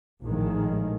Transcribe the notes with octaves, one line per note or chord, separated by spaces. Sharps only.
A#1 A2 D#3 G#3